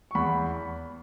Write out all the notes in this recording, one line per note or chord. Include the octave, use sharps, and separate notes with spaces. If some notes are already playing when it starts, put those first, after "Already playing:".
C#6
E2 B5